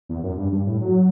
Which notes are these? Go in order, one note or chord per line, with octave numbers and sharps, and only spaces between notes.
E2
F#2
G2
G2
A2
F#3